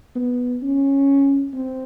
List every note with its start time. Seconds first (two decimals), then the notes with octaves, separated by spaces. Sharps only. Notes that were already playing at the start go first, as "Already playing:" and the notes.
0.15 B3
0.62 C#4
1.53 C4